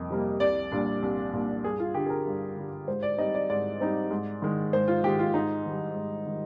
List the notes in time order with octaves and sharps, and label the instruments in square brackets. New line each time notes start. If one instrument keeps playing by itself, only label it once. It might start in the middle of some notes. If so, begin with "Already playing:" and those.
Already playing: [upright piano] F2 C3 G3 A#3 D#5
C3 G3 A#3
C2 D5
A#2 G3 D4
C2
A#2 G3 D4
G2 G#4
F4
D3 G3 D4 G4
G#4
A#4
G2
D3 G3 D4
G#2 C5
D5
G3 C4 D#4 D#5
D5
G#2 D5
G3 C4 D#4
G#2
D#3 G#3
G#2 C5
F4
D#3 G#3 G4
F4
G#2 D#4
D#3 G3
G#2
D#3 G3